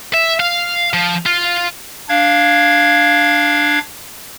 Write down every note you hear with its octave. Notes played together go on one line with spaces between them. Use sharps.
E5
F5
F3
F4
D4 F5 G#6